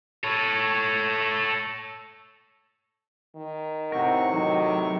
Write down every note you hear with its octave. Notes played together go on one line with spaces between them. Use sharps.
A4 C#5
D#3
A2 C3 C4 A#4 F#5 C#6
D#3 F#3 D#4